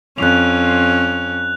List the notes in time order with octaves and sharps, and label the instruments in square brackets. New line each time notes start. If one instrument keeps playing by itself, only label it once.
[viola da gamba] F2 C#4 [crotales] F#6 F7